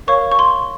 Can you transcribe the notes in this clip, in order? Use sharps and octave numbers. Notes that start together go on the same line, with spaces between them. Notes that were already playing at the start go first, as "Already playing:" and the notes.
A#4 C#5 F5 C#6
C#6
C6